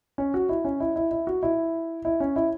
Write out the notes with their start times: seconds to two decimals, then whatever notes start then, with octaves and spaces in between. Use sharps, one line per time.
0.18 C#4
0.34 F#4
0.49 E4
0.65 C#4
0.80 E4
0.96 E4
1.11 E4
1.27 F#4
1.43 E4
2.05 E4
2.20 C#4
2.36 E4